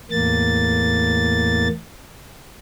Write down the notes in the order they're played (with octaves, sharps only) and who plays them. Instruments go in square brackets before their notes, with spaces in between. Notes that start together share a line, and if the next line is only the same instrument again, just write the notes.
[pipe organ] E2 A2 A#3 A6